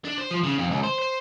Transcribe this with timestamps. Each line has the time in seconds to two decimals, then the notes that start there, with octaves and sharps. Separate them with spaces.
0.05 D4
0.18 C5
0.31 F3
0.43 C#3
0.58 F2
0.71 C#2
0.83 C5
0.99 C5